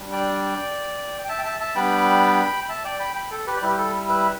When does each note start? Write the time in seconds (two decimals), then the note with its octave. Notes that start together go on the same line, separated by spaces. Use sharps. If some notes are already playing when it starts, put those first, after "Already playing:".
Already playing: G3 D4
0.12 D5 G5
1.25 G5
1.29 E5 A5
1.39 G5
1.44 E5 A5
1.60 E5 A5
1.75 G3 B3 D4 G5 B5
2.64 B5
2.69 E5 A5
2.84 D5 G5
3.00 G5 B5
3.16 G5 B5
3.31 A4
3.47 G4 B4
3.57 D5
3.62 G3 E4 G4 B4
3.78 A4
4.09 B4 E5